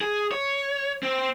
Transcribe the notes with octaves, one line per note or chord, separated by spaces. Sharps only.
G#4
C#5
C4